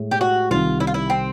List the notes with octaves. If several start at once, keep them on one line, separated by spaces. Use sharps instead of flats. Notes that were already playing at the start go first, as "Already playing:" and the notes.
Already playing: A2 G#3
G4
F#4
C2 C3 D#3 F4
E4
F4
E4
C4